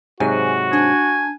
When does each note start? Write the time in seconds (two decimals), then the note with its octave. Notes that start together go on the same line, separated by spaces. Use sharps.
0.20 G#2 C3 F#3 F#4 G#5
0.73 D4 G#5